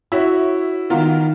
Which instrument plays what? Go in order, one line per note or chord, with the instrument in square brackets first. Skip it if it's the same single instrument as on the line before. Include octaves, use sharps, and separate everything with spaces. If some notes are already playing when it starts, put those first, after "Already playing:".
[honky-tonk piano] C#4 E5 [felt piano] E4 F#4
[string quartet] D#3 [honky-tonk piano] B3 F4 A#4